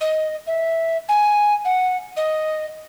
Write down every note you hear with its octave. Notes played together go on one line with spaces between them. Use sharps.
D#5
E5
G#5
F#5
D#5